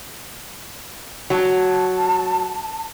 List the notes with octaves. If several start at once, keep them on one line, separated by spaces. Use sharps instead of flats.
F#3 A5